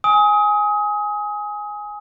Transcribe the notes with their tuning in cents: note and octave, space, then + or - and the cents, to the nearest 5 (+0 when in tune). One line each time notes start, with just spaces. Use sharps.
G#5 +0 D#6 +30